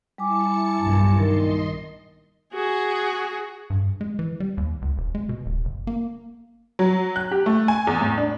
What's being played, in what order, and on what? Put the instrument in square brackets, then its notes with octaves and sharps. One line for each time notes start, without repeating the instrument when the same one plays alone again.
[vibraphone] G3 G#5 D6 [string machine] E4 A5 C#7
[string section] B1 G2 A#2
[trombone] D#3 [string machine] D#5 C6
[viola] F#4 G#4
[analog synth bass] G2
G#3
E3
G3
D#2
C#2
E1
G#3
B2
D1
F#1
A#3
[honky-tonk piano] F#3
F#6
G4
A3
G#5
E2
A2
D4